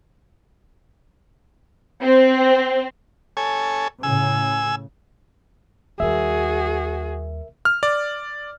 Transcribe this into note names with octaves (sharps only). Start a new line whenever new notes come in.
C4
A4 C#5 G#5
A2 C#3 G#5 E6
D#2 G3 F#4 G#4 A#4 E5
F6
D5